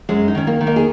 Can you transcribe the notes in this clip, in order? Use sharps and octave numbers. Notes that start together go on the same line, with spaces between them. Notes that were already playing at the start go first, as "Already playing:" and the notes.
F#2 G#3 C#4
D#4
D#3 C#4
A#3
D#3
A#3 D#4
G#4